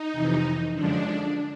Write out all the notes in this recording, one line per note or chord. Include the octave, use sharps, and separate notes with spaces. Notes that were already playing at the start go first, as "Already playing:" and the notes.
Already playing: D#4
F2 C3 E3
F#2 D3 F3 G#3 D4